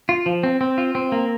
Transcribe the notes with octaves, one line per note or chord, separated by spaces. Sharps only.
F4
F3
C4
C4
F4
C4
A#3